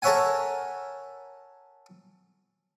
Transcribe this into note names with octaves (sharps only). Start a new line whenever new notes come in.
A4 A#4 C#5 E5 F#5 G#5